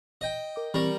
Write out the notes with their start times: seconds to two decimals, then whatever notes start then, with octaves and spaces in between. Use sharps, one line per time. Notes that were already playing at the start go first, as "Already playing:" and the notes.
0.21 D#5 G5
0.56 A#4 D6
0.74 E3 G3 C4 A#4 C#6